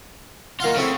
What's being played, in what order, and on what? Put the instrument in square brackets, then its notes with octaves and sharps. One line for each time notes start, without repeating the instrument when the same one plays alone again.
[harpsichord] D#3 F5 F#5 [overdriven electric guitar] A#3 F4
[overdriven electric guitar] C#3 [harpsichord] A3 C4 E4